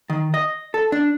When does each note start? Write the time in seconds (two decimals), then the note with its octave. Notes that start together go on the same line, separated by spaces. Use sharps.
0.10 D#3
0.34 D#5
0.74 A4
0.92 D4